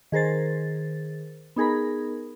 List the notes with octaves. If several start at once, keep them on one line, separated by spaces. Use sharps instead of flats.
D#3 G#4 A#4 C5 A6
B3 D#4 G#4 A#4 B5